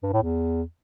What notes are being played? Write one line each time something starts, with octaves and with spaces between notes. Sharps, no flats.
G2
A2
E2